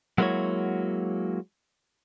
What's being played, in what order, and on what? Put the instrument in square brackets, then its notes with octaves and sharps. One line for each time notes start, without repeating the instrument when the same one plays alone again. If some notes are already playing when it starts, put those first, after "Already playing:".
[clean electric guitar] F#3 G#3 A#3 E4 F#4 C#5